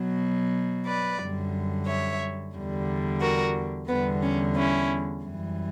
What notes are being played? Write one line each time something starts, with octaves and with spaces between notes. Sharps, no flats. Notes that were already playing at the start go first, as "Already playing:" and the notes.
Already playing: B2 F#3
B4 D5
F#2 D3 G3
C#5 E5
E2 D3 G3
F#4 A#4
E2 D3 G3 B3
C#4
C#4 E4
F#2 E3 G3